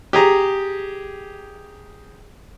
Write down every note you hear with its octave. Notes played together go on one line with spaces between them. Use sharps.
G4 G#4 A#5